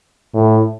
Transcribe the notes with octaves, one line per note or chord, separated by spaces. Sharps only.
A2